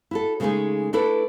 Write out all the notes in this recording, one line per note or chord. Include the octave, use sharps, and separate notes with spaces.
E4 F#4 A4
C#3 G#3 A3 C#4 D#4 G#4
A3 D4 E4 A4 B4